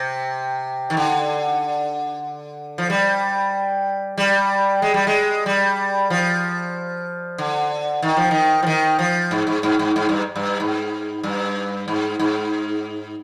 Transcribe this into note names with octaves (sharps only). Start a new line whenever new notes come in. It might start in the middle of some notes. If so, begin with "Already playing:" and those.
Already playing: C3
D#3
D3
F3
G3
G3
G#3
G3
G#3
G3
F3
D3
D#3
F3
D#3
F3
D#3
F3
G#2
G#2
G#2
G#2
G#2
G2
G2
G#2
G2
G#2
G#2